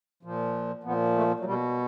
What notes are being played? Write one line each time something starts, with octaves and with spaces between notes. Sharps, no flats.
A#2 F3
A#2 F3 B3
A3
F#3
B2 G3